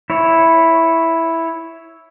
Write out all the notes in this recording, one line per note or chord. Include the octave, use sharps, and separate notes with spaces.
E4 C#5